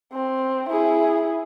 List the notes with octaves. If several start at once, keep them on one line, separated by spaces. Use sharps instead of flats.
C4
E4 G#4